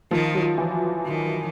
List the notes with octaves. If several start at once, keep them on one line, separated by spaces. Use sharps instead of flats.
D#3 F3
F#3
E3
D#3